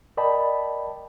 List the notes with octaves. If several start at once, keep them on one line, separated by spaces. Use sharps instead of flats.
A#4 D5 D#5 G5 A5 B5